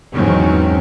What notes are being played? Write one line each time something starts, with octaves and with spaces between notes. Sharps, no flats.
E2 G#2 D#3 F#3 C4 C#4